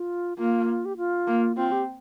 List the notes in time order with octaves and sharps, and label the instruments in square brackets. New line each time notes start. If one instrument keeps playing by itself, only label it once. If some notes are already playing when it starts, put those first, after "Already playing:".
Already playing: [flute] F4
[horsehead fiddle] A#3 [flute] F4
[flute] G4
F4
[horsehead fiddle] A#3
[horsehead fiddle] C4 [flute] F4
[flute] G4